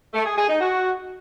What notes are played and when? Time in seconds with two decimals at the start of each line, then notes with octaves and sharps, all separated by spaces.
0.14 A3
0.25 G#4
0.37 G#4
0.49 D#4
0.60 F#4